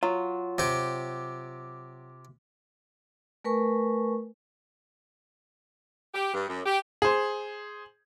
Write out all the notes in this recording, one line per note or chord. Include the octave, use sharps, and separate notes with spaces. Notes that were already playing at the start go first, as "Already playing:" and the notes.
F#3 F4
C3 G4
A3 A#4 B4 G#5 C#6
G4
G2
F#2
G4
G#4 C5